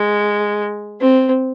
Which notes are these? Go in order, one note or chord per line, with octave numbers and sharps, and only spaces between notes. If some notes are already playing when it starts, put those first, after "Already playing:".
Already playing: G#3
C4